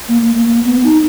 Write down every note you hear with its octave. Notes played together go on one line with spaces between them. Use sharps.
A#3
A#3
A#3
A#3
B3
D#4